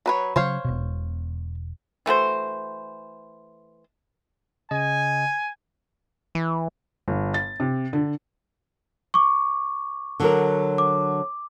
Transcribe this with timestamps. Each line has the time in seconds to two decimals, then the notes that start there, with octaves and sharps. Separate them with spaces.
0.06 F#3 B4 C#5
0.36 C#3 F#3 C5 C#5 F5
0.65 E1 B2
2.06 E3 A3 F#4 C5
4.71 C#3 D#5 G#5
6.35 E3
7.08 G1
7.34 A6
7.60 C3
7.93 D3
9.14 C#6 D6
10.20 D3 F#3 A#4
10.78 D6